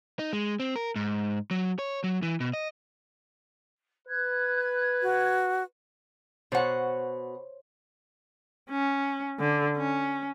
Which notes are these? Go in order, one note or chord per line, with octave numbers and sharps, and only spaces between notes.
D#4
G#3
C4
A#4
G#2
F#3
C#5
F#3
E3
B2
D#5
B4 F#6 G#6
F#4
B2 C5 C#5 F#5
C#4
D3
C#4